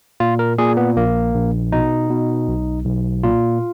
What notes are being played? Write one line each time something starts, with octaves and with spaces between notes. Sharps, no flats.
A#2 F4
A#4
A#2 G#4
B3
A#1 A#3
A#1
B2 D#4
B2
B1
B1
A#2 F4